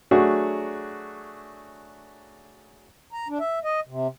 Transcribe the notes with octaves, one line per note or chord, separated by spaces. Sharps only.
F#3 A3 D4 F#4 G#4
A#5
D4
E5
D#5
C3